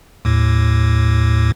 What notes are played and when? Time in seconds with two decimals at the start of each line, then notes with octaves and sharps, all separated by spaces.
0.25 D#2 A2